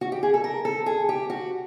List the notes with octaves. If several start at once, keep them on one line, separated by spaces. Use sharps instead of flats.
F#4
G4
G#4
A4
A#4
A4
G#4
G4
F#4